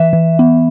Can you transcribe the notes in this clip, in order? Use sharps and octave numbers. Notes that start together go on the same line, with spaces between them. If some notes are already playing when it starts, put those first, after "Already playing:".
Already playing: E3 E5
E3
B3